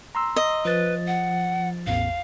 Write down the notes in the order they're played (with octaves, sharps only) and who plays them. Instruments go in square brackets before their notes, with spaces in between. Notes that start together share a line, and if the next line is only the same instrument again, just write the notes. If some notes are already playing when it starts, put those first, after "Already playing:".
[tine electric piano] A#5 C6 E6
[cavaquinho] D#5
[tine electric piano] F3 A6 [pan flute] B4
[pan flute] F#5
[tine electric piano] A1 E2 [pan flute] F5